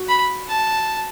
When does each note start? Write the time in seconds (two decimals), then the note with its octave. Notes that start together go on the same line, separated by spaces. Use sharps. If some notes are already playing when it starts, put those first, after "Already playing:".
Already playing: F#4
0.08 B5
0.48 A5